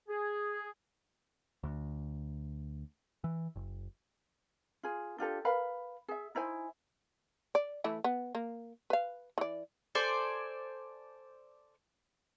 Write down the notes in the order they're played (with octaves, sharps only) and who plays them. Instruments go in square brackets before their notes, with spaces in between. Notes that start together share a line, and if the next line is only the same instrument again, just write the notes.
[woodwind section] G#4
[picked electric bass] D2
E3
F#1
[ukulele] F4 G#4
D4 F4 G4 A4
A#4 B4 F5 B5
G#4 E5
D#4 E4 C5 G#5
[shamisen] D5
E3 A3 E4
B3
A#3
B4 F5
E3 D5
[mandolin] A4 C5 D5 G#5